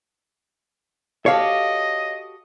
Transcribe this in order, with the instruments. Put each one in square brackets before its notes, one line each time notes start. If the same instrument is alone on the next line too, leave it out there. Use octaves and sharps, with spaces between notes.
[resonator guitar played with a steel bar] F#4 G4 A4 [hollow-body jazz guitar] C#5 F5 [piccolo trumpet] D#5